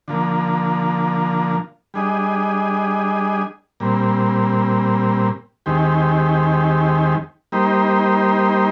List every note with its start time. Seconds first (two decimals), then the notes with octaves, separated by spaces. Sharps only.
0.08 D3 F3 A#3
1.94 G3 D4 G#4 D#5
3.80 A#2 G3 C4
5.66 D#2 D#3 G#3 C4 G4
7.52 G3 A#3 D#4 G4 C5